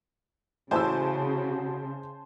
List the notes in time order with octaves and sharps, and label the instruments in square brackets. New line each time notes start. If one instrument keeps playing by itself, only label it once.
[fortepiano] A1 E4 E6 [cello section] C#3 [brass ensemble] F#4 [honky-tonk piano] C5 G#5 A5